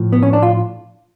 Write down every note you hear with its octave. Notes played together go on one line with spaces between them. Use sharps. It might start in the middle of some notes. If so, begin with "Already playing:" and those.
Already playing: A2 F3
B3
C#4
D4
F4